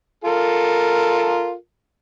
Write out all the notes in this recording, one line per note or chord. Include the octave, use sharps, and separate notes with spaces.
F4 A4 A#4